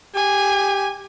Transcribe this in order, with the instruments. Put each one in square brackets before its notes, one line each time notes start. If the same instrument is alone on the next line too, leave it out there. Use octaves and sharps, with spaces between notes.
[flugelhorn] G4 [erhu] G#5